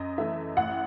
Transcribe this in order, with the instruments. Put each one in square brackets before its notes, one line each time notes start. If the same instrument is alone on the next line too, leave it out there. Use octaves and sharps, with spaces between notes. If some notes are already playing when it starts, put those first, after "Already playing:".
Already playing: [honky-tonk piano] F#2 D#5
E3 A3 E5
A1 F#5